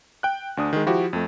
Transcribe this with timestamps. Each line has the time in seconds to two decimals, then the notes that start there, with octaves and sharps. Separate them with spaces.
0.23 G5 F#6
0.57 D2 D4 D#6
0.73 D#3 G#3
0.86 F3 E4 F#4 G4
1.13 F2 A3